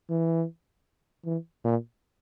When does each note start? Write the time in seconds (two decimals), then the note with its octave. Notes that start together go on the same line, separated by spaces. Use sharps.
0.10 E3
1.25 E3
1.64 A#2